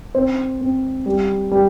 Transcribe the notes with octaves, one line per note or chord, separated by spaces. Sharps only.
C4 C5
C4
G3
G3